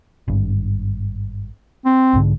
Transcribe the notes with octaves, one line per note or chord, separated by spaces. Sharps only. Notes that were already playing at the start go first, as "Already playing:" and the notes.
G#1 G2
C4
B1 G#2 D3